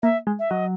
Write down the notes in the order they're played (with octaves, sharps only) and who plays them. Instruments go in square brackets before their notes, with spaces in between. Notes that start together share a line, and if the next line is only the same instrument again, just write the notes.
[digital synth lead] A#3 [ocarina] E5
[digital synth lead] G#3
[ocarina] E5
[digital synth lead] F#3 [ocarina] D#5